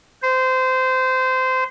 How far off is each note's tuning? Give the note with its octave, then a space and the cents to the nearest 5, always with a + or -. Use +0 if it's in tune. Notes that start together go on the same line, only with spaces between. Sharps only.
C5 -20